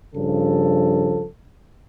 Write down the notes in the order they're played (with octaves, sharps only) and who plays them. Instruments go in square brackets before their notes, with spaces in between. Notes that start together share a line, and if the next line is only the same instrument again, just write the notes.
[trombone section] G2 C#3 F3 A4